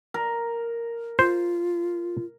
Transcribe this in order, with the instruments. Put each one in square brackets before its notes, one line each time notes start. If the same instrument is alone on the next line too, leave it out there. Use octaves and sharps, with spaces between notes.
[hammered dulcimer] A#4
[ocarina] F4 [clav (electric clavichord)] C5